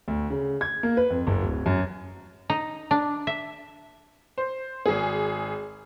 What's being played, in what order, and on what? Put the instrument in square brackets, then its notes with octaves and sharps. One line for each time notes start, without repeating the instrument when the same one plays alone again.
[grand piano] D2
C#3
G#6
A#3
B4
F2
F#1
D1
F#2
[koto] D#4
D4
E5
[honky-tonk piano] C5
G#1 G#4